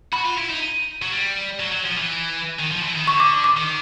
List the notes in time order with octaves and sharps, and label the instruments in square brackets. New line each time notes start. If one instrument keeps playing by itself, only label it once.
[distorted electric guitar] F#4 [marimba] B5
[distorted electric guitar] F4
E4
D#4
F#3
G3
F#3
F#3
F3
E3
D#3
F3
E3
D#3
[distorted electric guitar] D3 [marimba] C#6
[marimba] D6
D6
D6
[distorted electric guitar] D#3